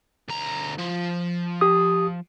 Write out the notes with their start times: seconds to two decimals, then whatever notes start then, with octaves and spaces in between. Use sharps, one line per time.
0.29 D2 A#5
0.79 F3
1.61 G4 D#6